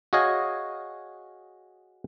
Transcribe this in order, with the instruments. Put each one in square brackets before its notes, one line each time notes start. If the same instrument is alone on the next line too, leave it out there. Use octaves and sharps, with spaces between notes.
[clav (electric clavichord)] F#4 G#4 C#5 D#5 F5 G#5